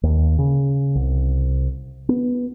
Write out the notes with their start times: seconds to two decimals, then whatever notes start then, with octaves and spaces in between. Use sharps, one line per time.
0.03 D#2
0.39 C#3
0.95 C2
2.09 B3